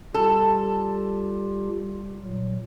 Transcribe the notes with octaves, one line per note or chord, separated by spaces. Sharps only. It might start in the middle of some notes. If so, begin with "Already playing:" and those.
G3 F4 G4 A4
A#2 F#3